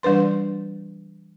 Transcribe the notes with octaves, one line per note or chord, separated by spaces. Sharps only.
E3 G3 D4 B4 C6